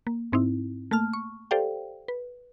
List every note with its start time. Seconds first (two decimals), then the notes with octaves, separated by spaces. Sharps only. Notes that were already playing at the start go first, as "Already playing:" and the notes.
0.07 A#3
0.32 G#2 C4 D#4 E4
0.91 A3 A#3 A5 F6
1.13 C#6
1.51 G4 A4 C5 D5 F5 G5
2.08 B4